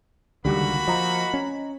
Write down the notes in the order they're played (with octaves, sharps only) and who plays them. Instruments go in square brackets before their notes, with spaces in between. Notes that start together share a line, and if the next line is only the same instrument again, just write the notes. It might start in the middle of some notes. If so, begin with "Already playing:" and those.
[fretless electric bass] C#2 D3 [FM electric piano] D#3 G3 G4 [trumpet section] A#3 F#4 B5
[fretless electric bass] F3 [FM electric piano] D#5 A#5
[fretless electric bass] C#4